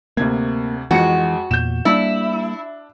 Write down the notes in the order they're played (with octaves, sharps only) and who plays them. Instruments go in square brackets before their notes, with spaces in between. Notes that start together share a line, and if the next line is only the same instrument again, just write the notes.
[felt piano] D2 C3 G#6 [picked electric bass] A#3
[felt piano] F2 G#3 C#7 [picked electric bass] E3 [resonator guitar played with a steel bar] F#4
[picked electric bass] E2 A#2 [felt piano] G6 E7
[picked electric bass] G3 A#3 [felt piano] D4 [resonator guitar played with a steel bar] E4